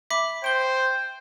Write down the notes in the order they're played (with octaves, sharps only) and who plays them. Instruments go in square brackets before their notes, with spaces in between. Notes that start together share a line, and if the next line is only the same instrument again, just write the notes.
[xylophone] E5 B5 D6
[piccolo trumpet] C5 [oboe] G5 [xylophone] D7 G7